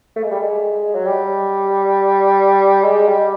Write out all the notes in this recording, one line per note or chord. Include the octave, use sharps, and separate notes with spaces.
A3
G#3
G3
G#3
F#3
G3
G#3
G3